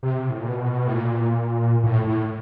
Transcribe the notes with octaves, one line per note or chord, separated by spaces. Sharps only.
C3
A2
A#2
B2
A2
A#2
A2
A2